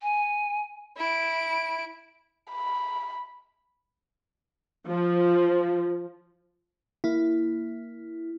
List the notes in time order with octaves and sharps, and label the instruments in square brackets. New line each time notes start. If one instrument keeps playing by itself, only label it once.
[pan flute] G#5
[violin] E4 D7
[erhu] B5
[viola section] F3
[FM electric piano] A#3 E4